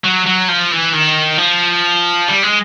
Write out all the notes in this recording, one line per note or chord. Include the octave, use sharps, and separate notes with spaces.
F#3
F#3
F3
E3
D#3
F3
G3
G#3